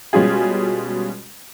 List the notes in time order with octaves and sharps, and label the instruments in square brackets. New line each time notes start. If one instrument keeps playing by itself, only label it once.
[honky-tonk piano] B2 G3 G#3 C#4 F4 G#4